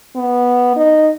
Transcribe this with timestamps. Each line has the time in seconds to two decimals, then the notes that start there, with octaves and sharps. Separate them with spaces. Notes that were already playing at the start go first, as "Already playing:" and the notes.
0.16 B3
0.76 D#4